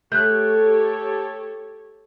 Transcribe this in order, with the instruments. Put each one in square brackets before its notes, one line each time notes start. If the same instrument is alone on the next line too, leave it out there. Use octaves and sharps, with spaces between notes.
[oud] A3 [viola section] G4 A4 C#5 [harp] F#6 G6